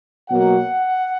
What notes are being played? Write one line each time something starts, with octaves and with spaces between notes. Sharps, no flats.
B2 F#3 A#3 F#5